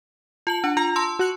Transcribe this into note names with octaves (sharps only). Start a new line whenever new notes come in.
F4 A5 F#7
D4 F#5
F4 A#5
A5 C6 E6
F#4 F#6 C#7